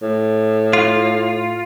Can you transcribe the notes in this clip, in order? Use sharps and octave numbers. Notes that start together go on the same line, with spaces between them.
A2
F4